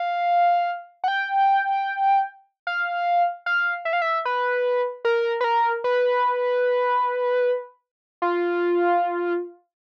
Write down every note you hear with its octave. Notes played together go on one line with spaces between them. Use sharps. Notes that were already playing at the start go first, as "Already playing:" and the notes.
Already playing: F5
F#5
G5
F5
F5
E5
F5
E5
B4
A#4
B4
A#4
B4
F4